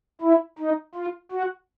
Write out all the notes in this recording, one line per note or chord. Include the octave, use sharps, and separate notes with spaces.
E4
D#4
F4
F#4